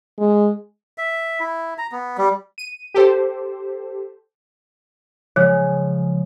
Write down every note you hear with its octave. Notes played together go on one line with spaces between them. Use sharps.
G#3
E5
E4
A#5
B3
G3
D#7
G4 A4 C5
C#3 F3 G#3 C#5